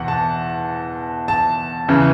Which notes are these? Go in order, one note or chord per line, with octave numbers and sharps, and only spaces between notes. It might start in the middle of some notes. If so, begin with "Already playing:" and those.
Already playing: E2 B2 F#5
A5
A5
E2 C#3 E3